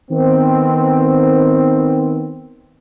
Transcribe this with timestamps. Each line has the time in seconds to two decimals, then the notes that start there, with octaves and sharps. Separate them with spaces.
0.11 D#3 B3 C4